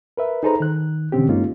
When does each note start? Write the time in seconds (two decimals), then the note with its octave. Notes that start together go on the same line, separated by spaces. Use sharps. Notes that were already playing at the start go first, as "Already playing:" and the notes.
0.17 A#4 B4 E5
0.43 D#4 G#4 A4 B4 C5 A#5
0.60 D#3 F#6
1.12 B2 D3 E3 C4 C#4 G4
1.29 G2 G#3 A#3 C#4 D#4 F4